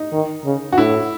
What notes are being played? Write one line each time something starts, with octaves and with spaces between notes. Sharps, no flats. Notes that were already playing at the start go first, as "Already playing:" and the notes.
Already playing: D#4
D#3
C#3
F#4
A2 E4